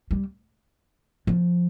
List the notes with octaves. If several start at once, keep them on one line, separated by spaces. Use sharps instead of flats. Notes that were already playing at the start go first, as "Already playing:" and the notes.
G3
F3